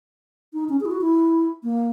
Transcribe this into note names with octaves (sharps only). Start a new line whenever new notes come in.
D#4
C#4
G#4
E4
F#4
E4
A#3